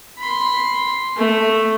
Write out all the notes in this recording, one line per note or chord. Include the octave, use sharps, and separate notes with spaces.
B5 C6
A3